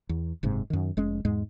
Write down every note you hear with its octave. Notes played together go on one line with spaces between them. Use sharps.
E2
F#1 G#2 C3
F#2 D#3
F1 G#3 C#4
E2 G#2 G#3